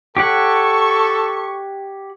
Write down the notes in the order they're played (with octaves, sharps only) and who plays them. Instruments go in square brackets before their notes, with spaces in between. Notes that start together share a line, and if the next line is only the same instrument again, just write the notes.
[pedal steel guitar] G4 C#5 F#5 [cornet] A4 [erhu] C#6